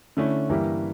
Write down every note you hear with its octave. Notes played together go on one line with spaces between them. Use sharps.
D3 A3 C#4 E4
G2 E3 A#3 E4 G4